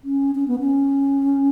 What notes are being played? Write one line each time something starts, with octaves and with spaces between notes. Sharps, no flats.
C#4
C#4
B3
C#4